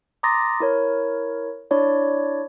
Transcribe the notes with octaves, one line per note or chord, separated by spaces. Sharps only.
A#5 C6 D6 D#6 A6 A#6
E4 A#4 C#5
D4 E4 C#5 D5